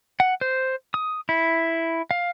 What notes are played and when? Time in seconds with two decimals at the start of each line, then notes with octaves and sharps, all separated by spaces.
0.20 F#5
0.41 C5
0.94 D#6
1.29 E4
2.11 F5